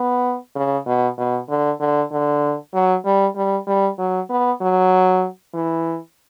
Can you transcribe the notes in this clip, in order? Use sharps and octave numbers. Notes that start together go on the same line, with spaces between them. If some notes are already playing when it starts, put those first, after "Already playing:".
Already playing: B3
C#3
B2
B2
D3
D3
D3
F#3
G3
G3
G3
F#3
B3
F#3
E3